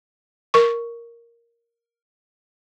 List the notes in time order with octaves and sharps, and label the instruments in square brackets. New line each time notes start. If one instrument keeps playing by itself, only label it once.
[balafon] A#4 C#6